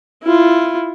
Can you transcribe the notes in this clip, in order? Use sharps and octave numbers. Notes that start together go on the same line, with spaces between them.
E4 F4